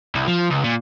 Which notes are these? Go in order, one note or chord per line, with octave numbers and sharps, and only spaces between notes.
C2
F3
C#2
A#2